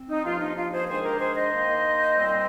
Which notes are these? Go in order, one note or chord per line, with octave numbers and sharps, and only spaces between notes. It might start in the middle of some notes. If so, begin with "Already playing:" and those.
Already playing: C4
D#4
G2 F3 A#3 D4 F4
D#4
F4
G#4 C5
D#3 G#3 D4 G#4 C5
G4 A#4
G#4 C5
C5 D#5
D#3 A#3 D#4
A#2 G3 C4